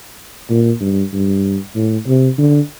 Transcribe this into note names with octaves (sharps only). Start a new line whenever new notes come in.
A#2
G2
G2
A2
C3
D3